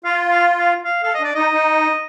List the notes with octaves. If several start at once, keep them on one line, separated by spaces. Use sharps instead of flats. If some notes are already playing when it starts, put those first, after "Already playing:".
F4 F5
F5
F5
F5
A4 F5
D#5
D4 D5
D#4 D#5
D#4